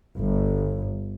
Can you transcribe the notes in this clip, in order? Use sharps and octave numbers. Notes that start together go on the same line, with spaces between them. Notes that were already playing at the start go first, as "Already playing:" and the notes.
G1